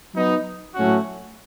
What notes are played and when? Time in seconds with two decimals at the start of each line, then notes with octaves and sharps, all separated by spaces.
0.15 F#3 B3 D#4
0.75 A2 F#3 A3 C#4 F#4